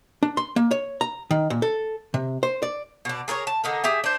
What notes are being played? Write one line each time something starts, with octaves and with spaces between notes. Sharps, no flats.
D4
C6
A#3
C#5
A#5
D#3
A#2
A4
C3
C5
D5
B2 D4
G#4 A#4 B4 C#5
A5
D3 D#4 A#4
G4 G#4 E5 G#5
D4 C5